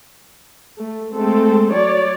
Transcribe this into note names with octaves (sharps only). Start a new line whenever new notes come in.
A3
G#3 A3 C4 A4
F#3 C#5 D5